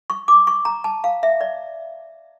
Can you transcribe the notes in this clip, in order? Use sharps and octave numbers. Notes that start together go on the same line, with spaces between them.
C#6
D6
C#6
A#5
A5
F5
E5
D5